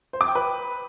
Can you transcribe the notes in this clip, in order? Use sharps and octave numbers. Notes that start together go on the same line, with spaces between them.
C5
D6
G5
B4